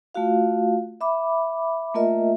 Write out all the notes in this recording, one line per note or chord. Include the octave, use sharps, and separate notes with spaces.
A3 F4 F#4 F5
E5 B5 D6
A3 A#3 F4 A#4 D#5 E5